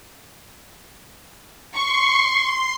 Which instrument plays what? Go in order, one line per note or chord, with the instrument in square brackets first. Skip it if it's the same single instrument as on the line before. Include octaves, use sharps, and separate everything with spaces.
[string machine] C6 C7 [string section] C#6